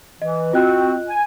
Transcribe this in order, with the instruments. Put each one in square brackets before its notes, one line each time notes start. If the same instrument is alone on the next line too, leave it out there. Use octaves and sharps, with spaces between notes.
[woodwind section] E3 [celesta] D#5
[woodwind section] C4 F#4 [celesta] F4 D#5 F#6
[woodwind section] G#5